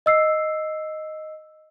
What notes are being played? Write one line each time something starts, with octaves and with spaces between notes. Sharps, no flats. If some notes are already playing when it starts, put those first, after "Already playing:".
D#5 E6 C7